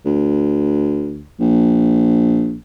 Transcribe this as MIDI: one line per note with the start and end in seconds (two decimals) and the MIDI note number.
0.05 1.26 38
1.40 2.57 34